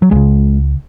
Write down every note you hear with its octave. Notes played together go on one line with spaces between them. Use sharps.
F#3
C#2 C#3 G#3